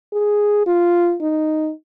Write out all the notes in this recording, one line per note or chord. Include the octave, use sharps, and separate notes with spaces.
G#4
F4
D#4